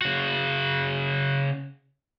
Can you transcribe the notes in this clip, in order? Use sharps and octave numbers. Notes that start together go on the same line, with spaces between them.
C#3 F#4